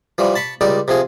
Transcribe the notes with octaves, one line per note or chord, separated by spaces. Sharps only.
E3 F3 G3
A5 B5 C#6
C#2 G3 D#4 D5
C3 F3 G#4